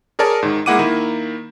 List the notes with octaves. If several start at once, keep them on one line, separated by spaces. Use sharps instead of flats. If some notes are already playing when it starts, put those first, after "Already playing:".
G#4 A#4 C#5 D5 A5
G#2 D#3
G#3 A#3 E4 F#5 D6 D#7
D#3 A#3 E4